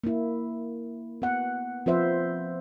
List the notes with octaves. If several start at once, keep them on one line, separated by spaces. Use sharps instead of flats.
A#3 E4
B3 F#5
F3 C4 F4 B4 C5 E5